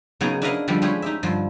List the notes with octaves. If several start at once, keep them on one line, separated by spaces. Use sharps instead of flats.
C#3 F#3 B3 D#4 G#4 A#4
D4 E4 A#4 B4 D#5 F5
D3 F3 G3
G#3 A3 C#4 E4 G4 G#4
D#4 G4 E5
G2 D3 F3